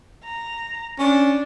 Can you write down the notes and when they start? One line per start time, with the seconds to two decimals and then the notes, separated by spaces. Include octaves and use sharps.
0.24 A#5
0.99 C#4 D4